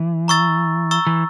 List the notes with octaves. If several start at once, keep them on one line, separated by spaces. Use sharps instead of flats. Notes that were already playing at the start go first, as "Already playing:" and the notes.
Already playing: E3
A#5 C#6 E6 A6
A#5 C#6 E6 A6
E3